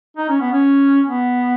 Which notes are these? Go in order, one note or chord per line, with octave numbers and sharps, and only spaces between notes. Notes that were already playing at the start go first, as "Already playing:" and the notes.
D#4
C#4
B3
C#4
B3